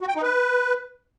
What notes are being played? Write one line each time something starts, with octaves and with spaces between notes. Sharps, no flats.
F#4
G5
D#4
B4